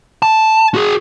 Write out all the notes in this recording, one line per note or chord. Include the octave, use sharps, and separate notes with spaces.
A5
F#4 G#4